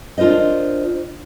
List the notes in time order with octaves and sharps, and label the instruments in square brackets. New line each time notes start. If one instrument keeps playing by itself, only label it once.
[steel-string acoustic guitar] D4 F4 A#4 C5 D#5